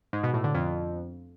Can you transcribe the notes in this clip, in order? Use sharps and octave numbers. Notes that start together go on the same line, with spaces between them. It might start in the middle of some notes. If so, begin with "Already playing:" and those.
G#2
B2
A2
D3
F2